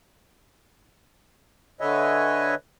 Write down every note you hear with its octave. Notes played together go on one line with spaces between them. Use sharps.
D3 B4 C#5 D#5 E5 G#5